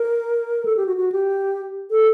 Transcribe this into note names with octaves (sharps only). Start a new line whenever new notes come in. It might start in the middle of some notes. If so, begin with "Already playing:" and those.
Already playing: A#4
A4
G4
F#4
F#4
G4
A4